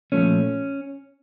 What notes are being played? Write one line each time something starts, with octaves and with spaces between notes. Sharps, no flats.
A#2 F3 A3 C#4